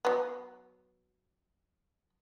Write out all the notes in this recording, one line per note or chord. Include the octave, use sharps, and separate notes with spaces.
F#3 B3